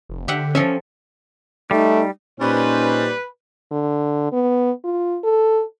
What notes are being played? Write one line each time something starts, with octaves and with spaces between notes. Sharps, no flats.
F1
D3 G4 E5 F#5
F3 C#4 A4 E5
G3 A3 D#4
A#2 G3 C#4 D#4 B4 C5
D3
B3
F4
A4